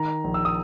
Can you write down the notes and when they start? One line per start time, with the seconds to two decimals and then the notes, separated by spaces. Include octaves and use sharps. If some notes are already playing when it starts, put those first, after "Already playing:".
Already playing: D#3 A#5
0.24 A#1
0.34 E6
0.45 D#6